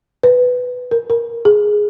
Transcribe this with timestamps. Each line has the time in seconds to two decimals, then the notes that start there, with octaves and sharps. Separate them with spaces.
0.23 B4
0.91 A#4
1.10 A#4
1.45 G#4